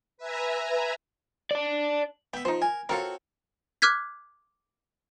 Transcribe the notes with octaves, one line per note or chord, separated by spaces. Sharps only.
B4 E5 G#5 A#5
D5 A5
B3 E5 G5
F3 D#4 C5
A#4 G#5
C4 F4 F#4 A4 A#4 C#5
D6 F6 F#6 G#6 B6